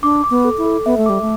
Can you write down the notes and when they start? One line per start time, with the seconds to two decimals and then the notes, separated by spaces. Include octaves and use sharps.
0.03 D4 D6
0.24 D6
0.30 B3
0.45 A4
0.58 E4
0.65 A4
0.85 B3 E5
0.97 A3
1.06 G3 D6
1.22 A3